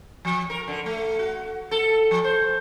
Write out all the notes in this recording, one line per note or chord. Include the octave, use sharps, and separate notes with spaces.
F3
A#4
D3
A3
F#4
A4
F3
C5